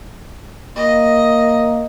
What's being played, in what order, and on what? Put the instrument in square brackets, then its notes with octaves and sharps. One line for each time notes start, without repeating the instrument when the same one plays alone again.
[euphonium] A#3 [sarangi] D#5